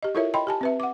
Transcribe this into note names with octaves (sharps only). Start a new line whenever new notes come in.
G4 D#5
E4 F4 A4 A#4 C#5 E5
D#5 G5 B5 C6
G4 G#5 A5
C4 B4 E5
F#5 D6